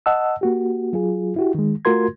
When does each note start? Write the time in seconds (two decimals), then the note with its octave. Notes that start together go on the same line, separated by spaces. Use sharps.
0.06 D#5 F#5 A5 E6
0.41 A#3 F#4 G4
0.93 F#3 F4 G#4
1.36 E4 F#4 G4
1.55 D#3 G#3
1.85 A3 F4 F#4 A#4 C6 G#6